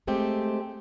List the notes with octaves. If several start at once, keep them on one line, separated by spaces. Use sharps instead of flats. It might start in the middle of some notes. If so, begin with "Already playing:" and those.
G#3 A3 C4 G4